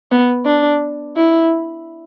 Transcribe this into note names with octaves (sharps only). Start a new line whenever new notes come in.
B3
D4
E4